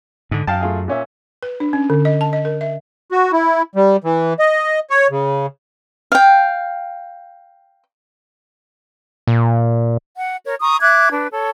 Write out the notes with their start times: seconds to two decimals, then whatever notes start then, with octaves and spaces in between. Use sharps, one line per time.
0.31 G#2 D3
0.47 F#2 F5 G5 A5
0.61 A3 F4 G#4
0.88 A#2 C#4 E5
1.43 B4
1.60 D4
1.73 C#4
1.90 D3
2.05 D#5
2.21 A5
2.33 D#5
2.45 A#4
2.61 E5
3.12 F#4
3.33 E4
3.75 G3
4.04 E3
4.39 D#5
4.90 C#5
5.10 C#3
6.12 F5 G5
9.27 A#2
10.15 F#5
10.45 A#4 C#5
10.60 A#5 C#6 D#6
10.81 E5 D6 F#6 G#6
11.11 D4 B4
11.32 A4 C#5